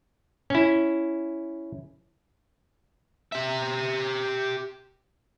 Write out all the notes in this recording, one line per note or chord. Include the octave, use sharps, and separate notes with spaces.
C#4 E4
G4 E5